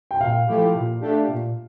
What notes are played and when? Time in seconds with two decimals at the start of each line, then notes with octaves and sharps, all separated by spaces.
0.11 G5
0.20 A#2 F5
0.47 F3 A3 E4 G4
0.74 A#2
1.00 A3 D4 G4
1.28 A#2